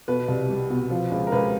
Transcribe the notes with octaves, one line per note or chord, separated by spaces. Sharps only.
B2 B4
C2
G3
B2
F3
C#2
A#4
C#2 B4